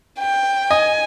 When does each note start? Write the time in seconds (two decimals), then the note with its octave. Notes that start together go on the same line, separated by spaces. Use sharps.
0.20 G5
0.70 D#5 G#5